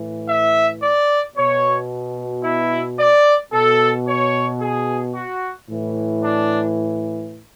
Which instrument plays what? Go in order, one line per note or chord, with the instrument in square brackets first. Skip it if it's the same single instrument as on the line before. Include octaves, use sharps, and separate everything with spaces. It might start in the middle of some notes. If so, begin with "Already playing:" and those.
Already playing: [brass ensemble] A2 E3
E5
D5
B2 C#5
E4
D5
B2 A4
C#5
G#4
F#4
A2 E3
D4